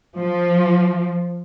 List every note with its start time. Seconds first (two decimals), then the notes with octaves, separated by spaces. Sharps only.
0.18 F3